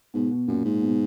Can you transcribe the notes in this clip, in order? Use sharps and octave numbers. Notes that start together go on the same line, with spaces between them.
G#2 B2
B2
F#2 A#2
G#2
B2